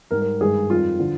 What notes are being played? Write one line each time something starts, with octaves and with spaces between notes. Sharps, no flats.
G#2 G3 A#4
A#4
G2 D#3 G#3 G#4
F2 D#3 G3 F4
D3 F3